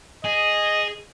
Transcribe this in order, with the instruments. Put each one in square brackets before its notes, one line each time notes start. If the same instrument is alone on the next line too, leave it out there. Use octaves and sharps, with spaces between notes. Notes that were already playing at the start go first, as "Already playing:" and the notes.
[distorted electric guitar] G#4 [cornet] D#5